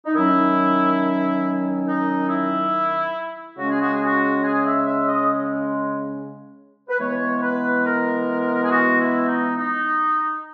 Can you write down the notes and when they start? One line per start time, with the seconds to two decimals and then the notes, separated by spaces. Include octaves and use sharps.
0.06 D#4
0.15 D#3 F#3 C#4 E4
1.87 D#4
2.29 E4
3.57 C#3 G#3 C#4 F#4
3.69 G#4
3.81 F#4
3.93 G#4
4.04 F#4
4.44 G#4
4.61 D#5
4.64 E5
4.86 E5
5.07 D#5
6.89 B4
7.00 E3 G#3 B3 C#5
7.38 C#5
7.43 B4
7.86 A#4
8.63 G#4
8.71 F#4
9.00 E4
9.27 D#4
9.57 D#4